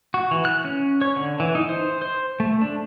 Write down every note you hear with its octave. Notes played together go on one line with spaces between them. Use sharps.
F#4
E3
F#6
C#4
C#5
D3
E3
D#4
C5
C5
A3
D4